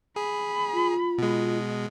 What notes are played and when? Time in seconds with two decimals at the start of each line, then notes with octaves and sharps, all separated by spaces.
0.16 G#4 B5
0.73 F4
1.18 B2 G#3